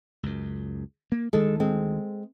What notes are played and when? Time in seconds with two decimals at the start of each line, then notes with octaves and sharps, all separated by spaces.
0.23 C#2 F#2
1.12 A#3
1.33 D2 D#3 G#3 A4
1.60 G#3 C4